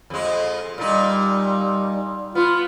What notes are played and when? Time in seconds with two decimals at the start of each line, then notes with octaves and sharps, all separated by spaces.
0.10 F2 G#3
0.78 A#2 G3 D#4
2.35 B3 F4